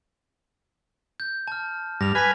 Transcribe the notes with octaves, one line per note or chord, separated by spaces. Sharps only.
G6
A5 F6
G2 A#6 F7
B4 G#5 F6 B6